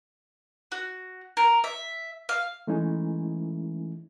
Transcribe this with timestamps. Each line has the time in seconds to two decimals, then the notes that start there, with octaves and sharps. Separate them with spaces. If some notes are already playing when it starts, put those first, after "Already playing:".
0.72 F#4
1.37 A#4
1.64 E5
2.29 F5
2.67 E3 G#3 A3 C#4 D#4 E4